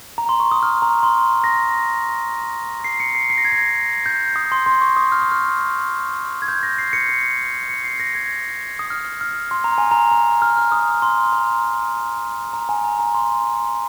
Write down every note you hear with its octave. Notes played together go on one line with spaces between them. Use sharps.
A#5
C6
C#6
D#6
F6
A#5
C6
A#6
C7
C#7
C7
C7
A#6
G#6
A#6
G6
D#6
C6
C6
C#6
D#6
F6
D#6
F6
G#6
G6
A#6
C7
C#7
C7
C#7
C7
A#6
G#6
D#6
F6
F6
C6
A#5
G#5
A#5
A#5
F6
F6
D#6
C6
A#5
A#5
G#5
A#5
A#5
C6